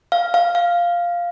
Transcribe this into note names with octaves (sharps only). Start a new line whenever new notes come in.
F5
F5
F5